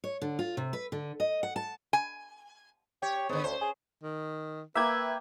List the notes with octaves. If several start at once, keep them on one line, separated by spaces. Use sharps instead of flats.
C#5
D3
F4
C3
B4
D3
D#5
F#5
A5
G#5
G4 C#5
G#2 D3 B3
D2 C5
G#4
D#3
A#3 B4 E5 G5 A#5 G#6